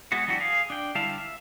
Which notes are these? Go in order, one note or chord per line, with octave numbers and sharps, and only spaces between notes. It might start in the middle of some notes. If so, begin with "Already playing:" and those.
G#3 B3 F#4
E3 F#3 D4 F#4 G4
G#4 F5
D4 G5
D3 G3 E4 F5 A5
E5